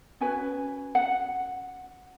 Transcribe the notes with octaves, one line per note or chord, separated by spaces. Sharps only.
C#4 F#4 B4 G#5
F#5